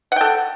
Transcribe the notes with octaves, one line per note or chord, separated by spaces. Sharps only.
A4 F#5 G5